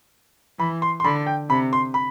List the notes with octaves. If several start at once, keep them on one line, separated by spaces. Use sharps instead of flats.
E3 B5
C6
C6
D3 B5
G5
C3 B5
C6
B5